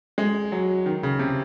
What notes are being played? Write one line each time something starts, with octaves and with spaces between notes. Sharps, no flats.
G#3
F#3
D#3
C#3
C3